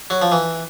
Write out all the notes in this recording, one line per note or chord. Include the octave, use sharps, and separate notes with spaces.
F#3
F3
E3